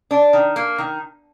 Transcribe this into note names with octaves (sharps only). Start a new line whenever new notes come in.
D4
D#3
A#3
D#3